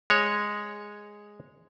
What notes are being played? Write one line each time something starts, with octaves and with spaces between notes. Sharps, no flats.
G#3 C#5